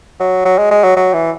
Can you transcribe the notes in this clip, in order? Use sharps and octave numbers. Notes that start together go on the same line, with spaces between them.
F#3
F#3
G#3
G#3
F#3
F#3
E3